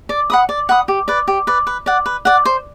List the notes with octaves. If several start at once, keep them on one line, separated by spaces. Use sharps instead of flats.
D5
F#5 B5 D#6
D5
F#5 B5 D#6
G4
B4 D5
G4
B4 D5
B4
D5 F#5
B4
D5 F#5
C5